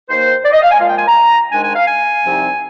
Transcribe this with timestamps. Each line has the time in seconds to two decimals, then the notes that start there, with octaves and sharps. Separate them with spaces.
0.08 D#2 D#3 A#3 C5
0.44 D5
0.53 D#5
0.62 F5
0.71 G#5
0.80 A#2 F3 G#3 F5
0.88 G5
0.98 G#5
1.07 A#5
1.52 G#2 D#3 G#3 D4 G#5
1.63 G#5
1.76 F5
1.87 G#5
2.23 C2 C3 F3 C4 D#4